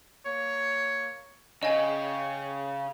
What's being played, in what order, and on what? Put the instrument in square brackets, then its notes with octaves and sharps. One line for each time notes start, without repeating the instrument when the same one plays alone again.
[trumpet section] A#3 C#5
[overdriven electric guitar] C#3 [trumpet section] C#5 G5 [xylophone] D#5 G#5